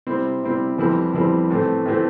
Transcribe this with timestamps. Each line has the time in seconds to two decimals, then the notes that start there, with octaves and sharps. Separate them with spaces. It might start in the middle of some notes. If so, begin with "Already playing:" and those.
0.07 C3 G3 C4 E4
0.43 C3 G3 C4 E4
0.78 F2 E3 G3 C4 E4
1.14 F2 E3 G3 C4 E4
1.50 A2 E3 A3 C4
1.86 A2 E3 A3 C4